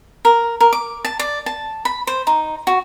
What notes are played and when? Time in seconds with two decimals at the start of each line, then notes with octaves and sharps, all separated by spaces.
0.25 A#4
0.60 A#4
0.73 D6
1.05 A5
1.19 D5
1.46 A5
1.85 B5
2.07 C5
2.27 D#4
2.67 F#4